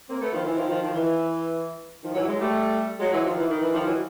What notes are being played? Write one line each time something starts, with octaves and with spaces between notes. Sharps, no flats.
A#3 C4
A3 B3
D#3 F3
E3
D#3 F3
D#3 F3
D#3 F3
E3
D#3 F3
E3 F#3
F#3 G#3
G3 A3
F#3 G#3
E3 F#3
D#3 F3
E3
D#3
E3
D#3 F3
E3 F#3